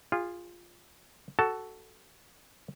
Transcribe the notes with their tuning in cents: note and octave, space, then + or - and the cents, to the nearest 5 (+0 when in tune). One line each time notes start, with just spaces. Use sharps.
F4 +0 G#4 -30
F#4 +15 A4 +0 A5 +0